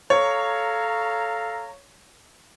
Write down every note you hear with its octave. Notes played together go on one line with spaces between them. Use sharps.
A4 C#5 F5 A#5